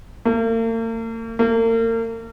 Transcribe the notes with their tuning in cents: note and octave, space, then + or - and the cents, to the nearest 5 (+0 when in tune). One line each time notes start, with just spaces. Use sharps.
A#3 -45
A#3 -40